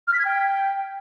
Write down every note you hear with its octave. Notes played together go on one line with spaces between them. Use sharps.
F6
B6
G#6
G5